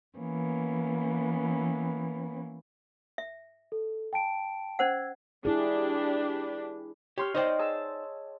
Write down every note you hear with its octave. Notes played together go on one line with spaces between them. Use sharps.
E3 A#3 B3 C#4
E5
A4
G5 A5 D7
C#4 C5 F#5 E6 G#6
D4 E4 G4 G#4 B4
G4 C#5 C6 F6
D#4 C5 D5 D#5 G5
G#4 A5 E6